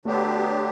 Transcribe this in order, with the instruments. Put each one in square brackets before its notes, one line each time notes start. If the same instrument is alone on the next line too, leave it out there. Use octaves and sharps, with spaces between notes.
[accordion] D3 F#3 B3 D4 G4 [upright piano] A3